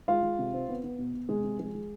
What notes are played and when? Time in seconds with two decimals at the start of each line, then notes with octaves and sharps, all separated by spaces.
0.08 G#3 F4 F5
0.23 G#3
0.39 C3
0.54 C4
0.68 B3
0.84 B3
0.99 B2
1.14 B2
1.29 C3 G#3 G#4
1.44 C3
1.59 F3 G#3 G#4
1.75 G#3